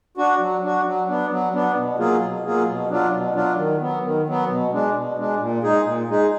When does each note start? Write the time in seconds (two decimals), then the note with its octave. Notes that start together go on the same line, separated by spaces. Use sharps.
0.17 D4 F#4
0.39 F#3
0.62 D4 F#4
0.85 F#3
1.08 B3 D4
1.31 F#3
1.54 B3 D4
1.76 B2
1.98 F#3 A#3 F4 G#4
2.22 B2
2.45 F#3 A#3 F4 G#4
2.67 B2
2.89 F#3 D4 F4
3.12 B2
3.35 F#3 D4 F4
3.57 D#3
3.81 F#3 B3
4.03 D#3
4.27 F#3 B3
4.49 B2
4.72 G#3 D4
4.95 B2
5.17 G#3 D4
5.40 A#2
5.63 G#3 D#4 G#4
5.85 A#2
6.09 G#3 D#4 G#4